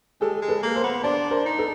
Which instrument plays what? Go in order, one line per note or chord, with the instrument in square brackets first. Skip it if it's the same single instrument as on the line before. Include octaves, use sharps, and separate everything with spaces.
[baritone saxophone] G#3 [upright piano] G4 A4
[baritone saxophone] G#3
[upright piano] A4 B4
[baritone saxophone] A#3
[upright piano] A#4 C5
[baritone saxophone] B3
[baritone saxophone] D4 [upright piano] C5 D5
[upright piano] A#4 C5
[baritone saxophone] D#4
[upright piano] A4 B4